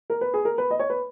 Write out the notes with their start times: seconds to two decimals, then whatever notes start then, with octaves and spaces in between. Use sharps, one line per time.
0.10 A#4
0.21 B4
0.34 G#4
0.45 A#4
0.58 B4
0.71 D#5
0.79 C#5
0.90 B4